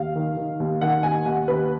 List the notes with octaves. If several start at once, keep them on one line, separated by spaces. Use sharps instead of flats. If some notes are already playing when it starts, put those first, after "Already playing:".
Already playing: D#2 F5
D#3
D#3
D#2
D#3 F#5
D#2 G#5
D#2 F#5
D#2 B4